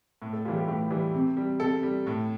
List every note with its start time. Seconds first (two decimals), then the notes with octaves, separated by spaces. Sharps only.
0.22 A2
0.33 A4
0.45 E3 G3 F4
0.56 G4
0.68 A2 G4
0.91 E3 G3
1.14 C3
1.37 G3
1.60 C3 A4
1.83 G3
2.07 A2